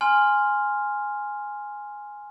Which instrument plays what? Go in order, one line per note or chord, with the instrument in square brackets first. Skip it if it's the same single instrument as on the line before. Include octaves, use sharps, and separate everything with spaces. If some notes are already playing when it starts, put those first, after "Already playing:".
[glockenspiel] G#5 C6 F6